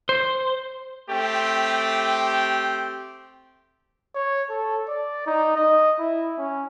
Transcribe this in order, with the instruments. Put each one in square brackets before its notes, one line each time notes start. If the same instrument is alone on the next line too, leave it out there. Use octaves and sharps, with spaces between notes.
[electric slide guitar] C5
[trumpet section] A3 C4 G4 G5
[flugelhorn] C#5
A4
D5
D#4
D#5
E4
C#4